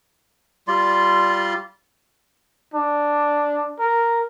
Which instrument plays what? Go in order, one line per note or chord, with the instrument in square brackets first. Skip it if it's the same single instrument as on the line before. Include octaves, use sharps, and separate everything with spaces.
[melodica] G3 F4 D5 C6
[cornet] D4
A#4